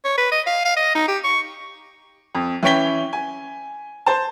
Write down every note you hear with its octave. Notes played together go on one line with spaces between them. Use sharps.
C#5
B4
D#5
F5
F5
D#5
D#4
G4
C#6
F2
E3 C#4 C#5 G5 B6 G7
G#5
C5 A5